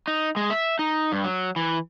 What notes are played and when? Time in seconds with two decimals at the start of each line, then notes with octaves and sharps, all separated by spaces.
0.08 D#4
0.36 G#3
0.50 E5
0.79 D#4
1.12 G2
1.24 F#3
1.56 E3